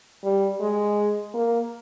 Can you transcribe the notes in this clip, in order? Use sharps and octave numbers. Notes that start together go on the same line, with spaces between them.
G3
G#3
A#3